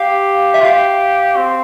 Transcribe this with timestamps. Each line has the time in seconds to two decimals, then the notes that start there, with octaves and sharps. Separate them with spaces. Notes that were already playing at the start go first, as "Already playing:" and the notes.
Already playing: G4 F5
0.54 E5
0.60 F4
0.65 G4 F5
1.36 C4